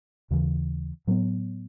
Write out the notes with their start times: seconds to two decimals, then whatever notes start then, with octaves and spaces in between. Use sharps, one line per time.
0.31 D#2 C#3 E3
1.07 A2 F#3 B3